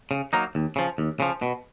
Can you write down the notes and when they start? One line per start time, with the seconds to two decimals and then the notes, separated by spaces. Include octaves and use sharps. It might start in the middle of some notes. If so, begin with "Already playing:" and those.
0.11 C#3
0.33 F#3 A#3 D#4
0.55 D#2
0.76 C#3 F3
0.98 D#2
1.20 C#3 F3
1.42 B2